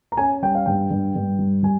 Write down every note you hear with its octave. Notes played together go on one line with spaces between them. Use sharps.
A#5
C#4 G#5
G3 G5
F5
G2 G5
G2
G2
G3
G3 G#5